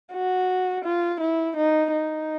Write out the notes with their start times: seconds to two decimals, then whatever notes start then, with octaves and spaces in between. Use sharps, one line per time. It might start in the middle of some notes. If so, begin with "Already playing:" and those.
0.13 F#4
0.84 F4
1.20 E4
1.56 D#4
1.93 D#4